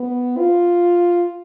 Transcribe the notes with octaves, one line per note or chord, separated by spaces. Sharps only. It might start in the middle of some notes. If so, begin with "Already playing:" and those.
Already playing: B3
F4